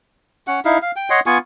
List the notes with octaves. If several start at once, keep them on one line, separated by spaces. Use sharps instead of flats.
C#4 F#5
D#4 E4 F5
F5
G5
C#5 D#5 F#5 C6
B3 F4 G#5 C#6